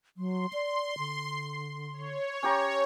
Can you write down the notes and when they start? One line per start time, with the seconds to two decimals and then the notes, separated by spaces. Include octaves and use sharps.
0.17 F#3 C6
0.53 D5
0.98 D3
1.93 C#5
2.43 C#4 G4 A#5